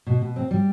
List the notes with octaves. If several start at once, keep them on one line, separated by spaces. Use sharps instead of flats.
B2
B2
C4
G3